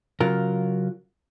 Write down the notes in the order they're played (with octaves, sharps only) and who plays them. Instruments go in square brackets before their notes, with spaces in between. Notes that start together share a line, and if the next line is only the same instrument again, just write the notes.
[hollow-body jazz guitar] C#3 F#3 F4 A#4